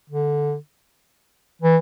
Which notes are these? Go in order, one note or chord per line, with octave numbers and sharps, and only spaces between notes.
D3
E3